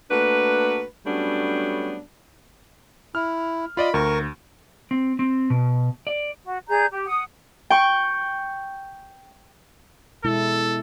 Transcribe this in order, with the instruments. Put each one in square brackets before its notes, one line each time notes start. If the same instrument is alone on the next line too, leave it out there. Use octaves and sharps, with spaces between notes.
[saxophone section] A3 A#3 D4 F#4 B4
F#3 G3 A3 B3 C#4 D4
[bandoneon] E4 [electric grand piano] F6
[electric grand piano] F4 D5 D#5 [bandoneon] B5
[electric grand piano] D2 [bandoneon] A#4 C#6
[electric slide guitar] C4
C4
B2
D5
[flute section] F#4
G#4 D5 A#5 G6
G4
F#5 D#6
[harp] G5 C#6
[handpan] B2 G#3 E4 [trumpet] A4